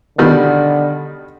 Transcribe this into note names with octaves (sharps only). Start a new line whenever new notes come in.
B2 D3 D#3 G3